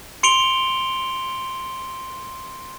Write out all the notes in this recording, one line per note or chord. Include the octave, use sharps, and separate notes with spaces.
C6 C#7 D7 F7 G7